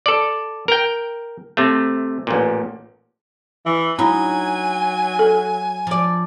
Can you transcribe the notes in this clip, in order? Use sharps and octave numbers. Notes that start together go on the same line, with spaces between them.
A4 D5
A#4 G5
C3 A3
A1 A#2
E3
F#3 D#4 E4 G#5
A4
F3 D5